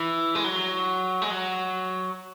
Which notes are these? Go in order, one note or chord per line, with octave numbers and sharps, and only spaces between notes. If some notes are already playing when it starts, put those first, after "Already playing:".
Already playing: E3
G#3
F#3
G#3
F#3